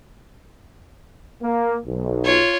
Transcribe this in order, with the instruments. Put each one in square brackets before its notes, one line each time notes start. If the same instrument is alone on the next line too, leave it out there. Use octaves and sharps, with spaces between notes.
[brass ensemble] A#3
B1
[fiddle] F4 C#5